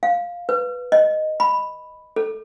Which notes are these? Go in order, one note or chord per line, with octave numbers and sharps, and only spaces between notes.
F5
B4
D#5
B5
A4